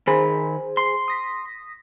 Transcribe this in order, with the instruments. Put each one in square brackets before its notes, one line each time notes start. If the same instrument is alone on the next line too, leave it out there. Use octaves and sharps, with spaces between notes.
[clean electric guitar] D#3 B5 [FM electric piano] G#4 C5 G#5
[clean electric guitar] C6
[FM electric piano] D#6 A#6 B6